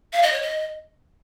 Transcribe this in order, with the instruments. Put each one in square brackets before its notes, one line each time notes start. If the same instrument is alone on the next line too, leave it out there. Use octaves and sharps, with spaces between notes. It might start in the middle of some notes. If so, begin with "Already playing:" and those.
[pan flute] F5
D#5
C#5
D#5